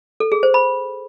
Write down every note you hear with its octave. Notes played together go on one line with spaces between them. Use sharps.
A4
G#4
C5
B5